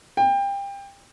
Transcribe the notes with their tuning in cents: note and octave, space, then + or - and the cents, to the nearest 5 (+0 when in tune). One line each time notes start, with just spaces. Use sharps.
G5 +25